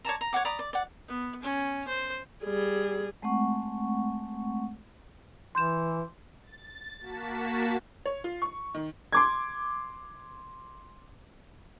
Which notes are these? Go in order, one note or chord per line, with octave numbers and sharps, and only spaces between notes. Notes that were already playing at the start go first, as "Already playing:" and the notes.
C#5 D5 A5 A#5
A#5
C#5 D#5 F#5 D6
D5 A#5 B5 D#6
D5
D5 F#5
B3
C#4
C5
G3 G#4
G#3 A3 C4 F#5 C#6
E3 C6 G6 E7
A6
A#3 F#4 A5 B6
C#5
F4
C#6
D#3
C6 D6 G#6